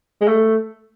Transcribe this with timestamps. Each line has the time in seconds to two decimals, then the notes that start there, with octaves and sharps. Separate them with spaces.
0.21 G#3
0.28 A3